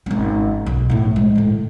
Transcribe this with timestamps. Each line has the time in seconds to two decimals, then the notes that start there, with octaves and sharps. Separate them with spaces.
0.06 G#1 C#4
0.66 B1
0.90 A2 E4
1.16 G#3
1.35 A2 D3